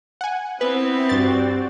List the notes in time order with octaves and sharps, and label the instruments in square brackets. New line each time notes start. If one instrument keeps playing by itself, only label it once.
[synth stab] F#5 G#5
[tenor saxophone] B3 [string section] C4 [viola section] E4 [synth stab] B4
[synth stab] G2 A6 [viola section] F#4 G4 D5